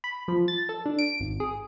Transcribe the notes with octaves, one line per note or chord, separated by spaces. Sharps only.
B5
F3
A6
A4
D4
D7
G#1
G#4